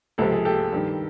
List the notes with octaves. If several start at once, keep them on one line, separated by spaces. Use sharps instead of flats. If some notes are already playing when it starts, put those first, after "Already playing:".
C#2 C3 F3 A4
G#4
G4 A4
G2 D#3